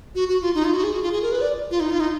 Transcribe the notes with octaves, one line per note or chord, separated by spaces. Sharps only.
F#4
F#4
F4
D#4
F4
F#4
G#4
F#4
F4
G#4
A#4
B4
D5
F4
D#4
F4
D#4